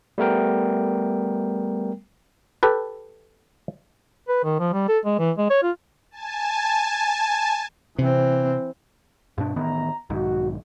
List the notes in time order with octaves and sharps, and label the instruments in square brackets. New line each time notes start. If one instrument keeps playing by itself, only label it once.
[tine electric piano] G3 A3 B3 A#4 G5
[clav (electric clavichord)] G4 A4 B4
[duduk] B4
D#3
F3
G3
A4
G#3
E3
G#3
C#5
F4
[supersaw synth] G#5 A5
[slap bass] C3 [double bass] E3 C4
[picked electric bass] G2 B2 D4
[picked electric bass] A1 D#3 B3 [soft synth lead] A#5
[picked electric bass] B1 G#2 D#3 [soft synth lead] F#4